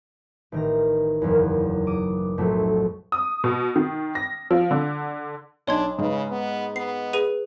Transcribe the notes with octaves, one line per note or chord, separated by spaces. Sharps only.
A1 D#3 A#5
F#1 E2
D6 D#6
B1 F2 A2 F#3 A3
D#6
B2
D#3
A#6
F3
D3
B1 D4 C#5 C6 G#6
G#2 C#3 B4
B3
B3 C7
G#4 B4 D#7